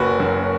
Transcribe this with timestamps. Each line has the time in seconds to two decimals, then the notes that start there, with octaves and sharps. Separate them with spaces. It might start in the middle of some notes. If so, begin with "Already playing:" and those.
Already playing: F#1 F#4 B4
0.20 F#2 F#3